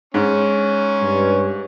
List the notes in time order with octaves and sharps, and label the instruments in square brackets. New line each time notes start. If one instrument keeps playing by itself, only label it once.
[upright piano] G#2 [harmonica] C#4
[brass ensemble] G2